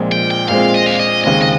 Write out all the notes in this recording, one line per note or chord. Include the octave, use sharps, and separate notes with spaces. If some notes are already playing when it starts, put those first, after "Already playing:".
Already playing: A#1 A#2 G#3 C4
G5
G5
A#1 A#2 G#3 C4 F5
D#5
F5
D#5
D#2 C#3 G#3 C4 D#5
D#5